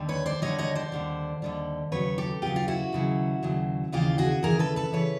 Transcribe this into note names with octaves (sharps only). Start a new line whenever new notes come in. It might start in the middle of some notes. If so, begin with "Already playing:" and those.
Already playing: D#2 D3 G3
B4 C#5
C5 D5
D#2 D3 G3 C#5 D#5
C#5 D#5
C5 D5
D#2 D3 G3
D#2 D3 G3
D#2 C#3 F#3 B4 C#5
G4 A4
D#2 C#3 F#3 F4 G4
F4
E4 F#4
D#2 C#3 F#3
D#2 C#3 F#3
D#2 C#3 E3 F4 G4
F#4 G#4
D#2 C#3 E3 G#4 A#4
A4 B4
A4 B4
C#3 E3 B4 C#5